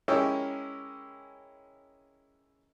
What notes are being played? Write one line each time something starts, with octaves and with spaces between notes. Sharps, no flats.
G#3 C#4 E4 G4 A#4 E5